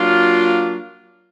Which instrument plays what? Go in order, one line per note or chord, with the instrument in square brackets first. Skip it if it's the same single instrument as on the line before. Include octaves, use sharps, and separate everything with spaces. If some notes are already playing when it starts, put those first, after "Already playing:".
Already playing: [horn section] F#3 A#3 D4 F4